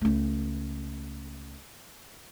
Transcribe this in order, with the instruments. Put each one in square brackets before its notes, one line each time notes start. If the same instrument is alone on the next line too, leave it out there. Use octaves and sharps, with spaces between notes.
[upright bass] C#2 A3